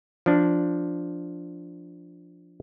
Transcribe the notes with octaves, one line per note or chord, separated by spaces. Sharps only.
F3 D4